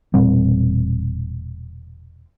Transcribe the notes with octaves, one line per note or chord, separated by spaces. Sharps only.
E1 A#2 G3 C4